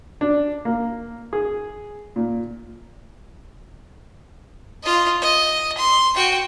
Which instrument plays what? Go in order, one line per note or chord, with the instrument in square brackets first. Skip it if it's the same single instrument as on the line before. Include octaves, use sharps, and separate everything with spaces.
[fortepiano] D4
A#3
G#4
A#2
[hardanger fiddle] F4 D#5
D#5
C6
F#4 G5